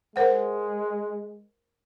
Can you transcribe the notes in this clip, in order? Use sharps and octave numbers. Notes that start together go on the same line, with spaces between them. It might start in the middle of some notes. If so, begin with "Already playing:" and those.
G#3 A#4 C5 F#5